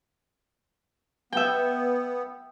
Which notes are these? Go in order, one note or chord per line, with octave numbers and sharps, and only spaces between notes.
B3 E5 G5